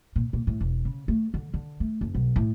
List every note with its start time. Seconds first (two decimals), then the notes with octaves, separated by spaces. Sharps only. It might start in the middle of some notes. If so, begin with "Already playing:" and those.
0.16 A#2
0.33 A#2
0.47 A2
0.61 E1
0.85 C#3
1.08 A3
1.34 D3
1.54 D3
1.80 A3
2.01 F#1
2.15 B1
2.36 A2